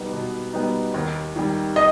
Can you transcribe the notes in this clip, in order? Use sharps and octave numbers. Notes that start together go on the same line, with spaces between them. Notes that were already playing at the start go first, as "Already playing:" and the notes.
Already playing: B2 G3 B3 D#4
B2
G3 B3 D#4
D#2
D#3 G3
D#5